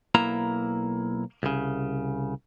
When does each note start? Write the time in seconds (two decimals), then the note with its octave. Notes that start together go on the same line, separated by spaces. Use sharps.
0.15 B1 A#3 E4 A#5
1.43 C2 C#3